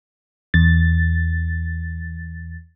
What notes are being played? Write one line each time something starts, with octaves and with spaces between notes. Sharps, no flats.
E2 A6